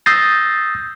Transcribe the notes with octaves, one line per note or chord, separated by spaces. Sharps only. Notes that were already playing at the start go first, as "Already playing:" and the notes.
D#6 E6 G6 A6 A#6 C7